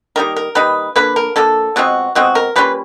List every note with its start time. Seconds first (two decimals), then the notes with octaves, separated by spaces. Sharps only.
0.16 D#3 G3 A#3 D#4 A#4
0.36 A#4
0.55 D#3 G3 A#3 D#4 B4
0.96 D3 F3 A#3 B4
1.16 A#4
1.36 D3 F3 A#3 A4
1.76 B2 G#3 C4 F4 F#4
2.15 B2 G#3 C4 F4 F#4
2.35 A#4
2.56 G3 A#3 C#4 F4 B4